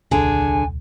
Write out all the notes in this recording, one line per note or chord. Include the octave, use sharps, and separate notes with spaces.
D#1 C2 D3 G#4 G#5